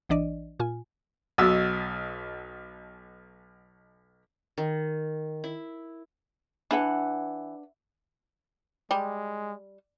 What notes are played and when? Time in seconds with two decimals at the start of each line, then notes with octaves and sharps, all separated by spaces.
0.09 A#1 E3 D4 D5 D#5
0.60 A#2 F4 G#5
1.38 B1 B2 E6
4.58 D#3
5.44 E4
6.71 E3 D4 B4 F#5
8.91 G3 G#3